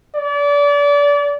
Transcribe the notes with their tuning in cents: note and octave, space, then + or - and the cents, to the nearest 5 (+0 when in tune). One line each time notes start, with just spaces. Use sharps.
D5 -30